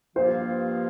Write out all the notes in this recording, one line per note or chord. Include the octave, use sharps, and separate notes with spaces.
G2 F3 A#3 F4 C5